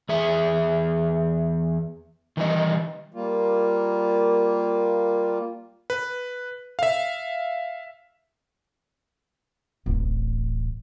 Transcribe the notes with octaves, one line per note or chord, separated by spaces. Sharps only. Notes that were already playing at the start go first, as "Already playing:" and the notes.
E2 G#4 E5
D#3 E3 G3 D#5
G3 A#3 F4
B4
E5 F5
D1 A1